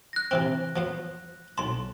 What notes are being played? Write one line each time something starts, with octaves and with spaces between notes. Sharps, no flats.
F#6 A#6
C3 E3 C4
F3 B3 C5
B1 A5 C6